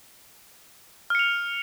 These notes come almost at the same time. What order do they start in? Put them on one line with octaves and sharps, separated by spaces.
F6 C#7 F7